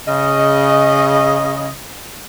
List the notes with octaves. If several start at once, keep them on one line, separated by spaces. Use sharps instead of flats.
C#3 D#5